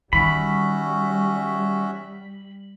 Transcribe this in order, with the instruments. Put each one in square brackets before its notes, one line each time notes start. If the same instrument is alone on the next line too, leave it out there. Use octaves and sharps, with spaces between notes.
[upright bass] D#3 [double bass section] G3 [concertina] C#4 F#4 E5 [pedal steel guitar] B5